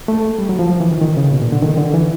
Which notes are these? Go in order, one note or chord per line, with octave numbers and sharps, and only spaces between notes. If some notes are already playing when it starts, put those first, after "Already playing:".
A3
G3
F#3
F3
F3
E3
D#3
D#3
C#3
B2
A#2
D3
D#3
D3
E3